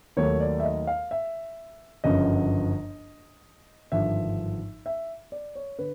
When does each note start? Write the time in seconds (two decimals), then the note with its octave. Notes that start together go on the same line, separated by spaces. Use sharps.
0.17 D#2 D#3 F#3 A3 C#5
0.40 D5
0.60 E5
0.64 D#5
0.87 F5
1.11 E5
2.04 G1 F#2 C#3 F3 D#5
3.92 G#1 G2 D3 F3 E5
4.86 E5
5.32 D5
5.55 C#5
5.79 D3 B4